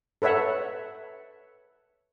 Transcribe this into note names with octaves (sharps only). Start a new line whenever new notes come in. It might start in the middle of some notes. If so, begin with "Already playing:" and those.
A4 B4 C#5 E5 F#5